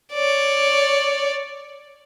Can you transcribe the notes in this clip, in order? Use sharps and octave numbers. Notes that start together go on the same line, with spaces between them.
C#5 D5